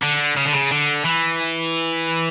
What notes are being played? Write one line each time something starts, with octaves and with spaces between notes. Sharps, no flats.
D3
C#3
D3
C#3
D3
E3